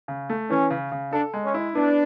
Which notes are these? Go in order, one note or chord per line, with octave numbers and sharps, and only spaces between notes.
C#3
A3
E3 C#4
C#3
C#3
D4 A4
G#3
C#4
E4
B3 D4